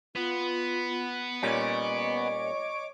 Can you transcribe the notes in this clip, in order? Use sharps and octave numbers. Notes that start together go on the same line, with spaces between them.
B3 F4
A#2 G3 C#4 C#5 D#5 D6